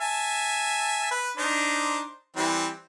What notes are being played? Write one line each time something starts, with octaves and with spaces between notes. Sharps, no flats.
E5 G#5 A5
B4
D4 D#4 C5
E3 G3 C4